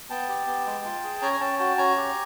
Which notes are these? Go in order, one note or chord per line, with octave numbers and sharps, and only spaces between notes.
B3 G5 A5
G4
B3
G#3
F4
G#4
C#4 G#5 A#5
G#5
C#4 G5 A5
F#4 G5 A5
C#4 G#5 A#5
G4